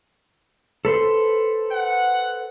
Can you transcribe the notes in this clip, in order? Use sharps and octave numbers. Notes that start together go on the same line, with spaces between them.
A4 B4 C5
F#5